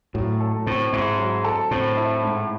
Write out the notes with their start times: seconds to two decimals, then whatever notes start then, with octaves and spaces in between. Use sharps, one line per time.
0.14 A2 F#3
0.40 A4
0.66 A2 C4
0.92 G#2 E4
1.18 F#3
1.45 A4
1.71 A2 C4
1.97 E4
2.23 G#2